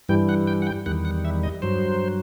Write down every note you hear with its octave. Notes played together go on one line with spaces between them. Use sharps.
G2 E3 G3 G5
F#5
G5
F#5
G5
E2 D#3 G3 F#5
F#5
E5
D#5
G2 F#3 C5